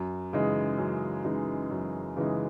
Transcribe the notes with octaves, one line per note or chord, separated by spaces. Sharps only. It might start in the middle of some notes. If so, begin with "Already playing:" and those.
Already playing: F#2
C#3 E3 G#3 D#4
F#2
C#3 E3 G#3 D#4
F#2
C#3 E3 G#3 D#4